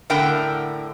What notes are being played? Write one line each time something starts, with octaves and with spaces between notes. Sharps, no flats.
A2 D3 A#4 E5 F#5 G5